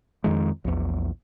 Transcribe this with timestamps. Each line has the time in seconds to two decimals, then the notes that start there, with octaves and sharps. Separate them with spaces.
0.24 F2 D#3 G#3
0.65 A#1 E2